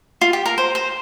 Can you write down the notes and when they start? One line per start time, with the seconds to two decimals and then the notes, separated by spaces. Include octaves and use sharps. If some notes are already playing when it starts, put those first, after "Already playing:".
0.21 F4
0.33 G4
0.46 A#4
0.58 C5
0.75 C5